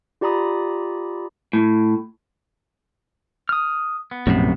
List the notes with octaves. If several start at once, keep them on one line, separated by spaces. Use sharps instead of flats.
F4 G4 D5 A#5 B5 D#6
A2
D#6 F6
B3
A#1 F#2 A2 C3